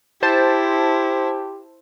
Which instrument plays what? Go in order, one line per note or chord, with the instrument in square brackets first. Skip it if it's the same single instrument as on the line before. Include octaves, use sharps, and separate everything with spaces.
[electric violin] E4 [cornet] G4 [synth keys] C5 A5